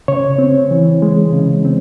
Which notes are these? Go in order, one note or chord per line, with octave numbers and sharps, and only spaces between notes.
C#3 C#5
C4
E3
G#3
C#3
C4